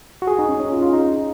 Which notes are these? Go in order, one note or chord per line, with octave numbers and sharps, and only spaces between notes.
F#4
G#4
D#4
C#4
C#4
F4
F4
D#4